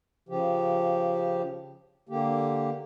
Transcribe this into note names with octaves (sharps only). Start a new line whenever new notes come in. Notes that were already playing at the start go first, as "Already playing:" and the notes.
C#3 F3 G4
D3 A#3 G4